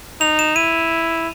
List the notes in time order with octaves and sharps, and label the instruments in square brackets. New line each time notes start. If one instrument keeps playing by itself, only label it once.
[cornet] D#4 [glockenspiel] F7
[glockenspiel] E7
[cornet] E4 [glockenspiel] D#7